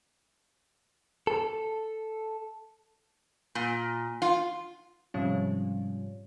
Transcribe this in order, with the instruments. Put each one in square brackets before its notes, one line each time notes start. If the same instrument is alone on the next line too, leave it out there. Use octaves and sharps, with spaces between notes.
[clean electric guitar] A4
[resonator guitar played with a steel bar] A#2
F4
[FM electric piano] G#2 C3 F3 G3 C#4 F4